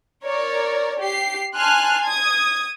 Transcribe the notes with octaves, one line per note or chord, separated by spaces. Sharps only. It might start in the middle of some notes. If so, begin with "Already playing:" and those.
A#4 C#5 D5
G4 C7
G#5 A5 C6 F6 F#6
D#6 G#6